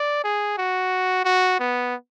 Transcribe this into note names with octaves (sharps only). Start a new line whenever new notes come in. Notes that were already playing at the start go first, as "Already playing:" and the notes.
Already playing: D5
G#4
F#4
F#4
B3